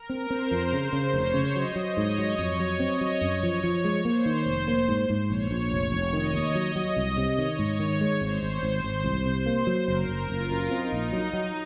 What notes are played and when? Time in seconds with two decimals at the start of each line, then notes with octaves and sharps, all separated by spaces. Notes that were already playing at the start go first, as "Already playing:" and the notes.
Already playing: A#4
0.09 C4
0.30 C4 C5
0.51 F2
0.71 C#3 C5
0.93 C#3
1.13 F1 C#5
1.34 C#3
1.55 F#3 D#5
1.76 F#3
1.97 G#2 C#5
2.18 F#3
2.38 F2
2.60 F#3
2.80 C4 D#5
3.01 F#3
3.21 F#2 C#5
3.43 F3
3.64 F3
3.84 G#3
4.05 A#3 C5
4.25 D#3
4.46 F1
4.68 A#3
4.88 G#2
5.10 G#2
5.29 A#1 C#5
5.51 A#1
5.72 F1
5.92 F1
6.13 D#3 D#5
6.34 D#2
6.55 F#3
6.76 F#3
6.96 C2 D#5
7.17 C3
7.38 D#3 C#5
7.59 G#2
7.79 D#3
8.01 G#3
8.21 G#1 C5
8.43 G#1
8.63 G#1
8.84 G#1
9.04 C2
9.26 C3
9.46 A#3
9.67 F#3
9.88 F#1 A#4
10.09 F#1
10.30 F#1 F4
10.50 F#2
10.71 C4 D#4
10.92 A#1
11.13 F#3
11.33 F#3